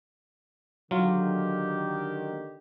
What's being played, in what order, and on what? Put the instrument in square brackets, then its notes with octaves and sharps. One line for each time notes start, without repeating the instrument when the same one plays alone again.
[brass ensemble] D3 D#3 G4 [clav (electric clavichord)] F#3 F4